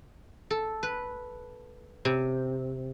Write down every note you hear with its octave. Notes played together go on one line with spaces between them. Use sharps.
A4
B4
C3